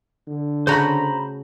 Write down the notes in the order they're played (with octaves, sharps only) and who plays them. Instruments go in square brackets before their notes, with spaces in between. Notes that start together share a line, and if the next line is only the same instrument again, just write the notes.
[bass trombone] D3
[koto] C#3 A3 F#4 [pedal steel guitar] C5 A#5 B5